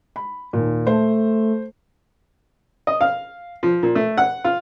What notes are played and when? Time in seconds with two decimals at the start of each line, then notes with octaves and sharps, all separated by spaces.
0.16 B5
0.53 D#2 A#2
0.87 A3 C5
2.87 D#5
3.01 F5
3.63 F3
3.83 A#2
3.95 A3
4.18 F#5
4.44 F4